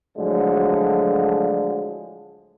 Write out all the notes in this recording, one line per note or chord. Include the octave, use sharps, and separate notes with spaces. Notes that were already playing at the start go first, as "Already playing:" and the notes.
A2 D3 F3 F#3 G#3